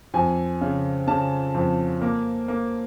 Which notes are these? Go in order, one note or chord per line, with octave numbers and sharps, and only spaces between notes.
F2 G#5
C#3
C#3 A5
F2
A#3
A#3